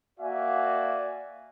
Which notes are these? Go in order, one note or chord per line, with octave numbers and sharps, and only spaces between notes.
A#3 F#4 D5 E5 F5 G#5